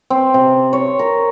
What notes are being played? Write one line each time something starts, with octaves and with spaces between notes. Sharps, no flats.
C4
C3
C#5
A#4